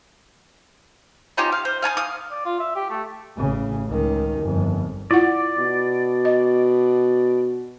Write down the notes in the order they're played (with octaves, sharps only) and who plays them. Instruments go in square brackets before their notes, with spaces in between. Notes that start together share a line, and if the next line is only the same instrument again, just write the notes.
[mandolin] C#4 D#4 F4 G4
F5
C5
F5 G#5 A5 D#6
F5 D#6
[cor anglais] D5
F4
E5
G4
A3
[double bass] A1 C#3
C#2 D#3
G1 F2
[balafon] E4 F4 F#5 [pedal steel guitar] D5
[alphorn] B2
[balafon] D#5